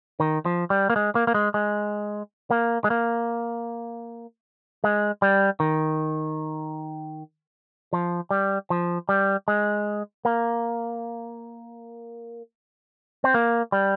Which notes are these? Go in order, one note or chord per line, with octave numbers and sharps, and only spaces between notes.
D#3
F3
G3
A#3
G#3
A#3
A#3
G#3
G#3
A#3
G#3
A#3
G#3
G3
D#3
F3
G3
F3
G3
G#3
A#3
C4
A#3
G3